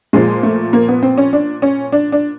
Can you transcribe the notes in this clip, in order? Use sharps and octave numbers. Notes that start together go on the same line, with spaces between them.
A#2 F3 G#3
A3
A#3
B3
C4
C#4
D4
C#4
D4
D4